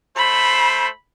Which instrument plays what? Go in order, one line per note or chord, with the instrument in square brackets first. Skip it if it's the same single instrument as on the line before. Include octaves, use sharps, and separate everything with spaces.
[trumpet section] A3 C5 [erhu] B5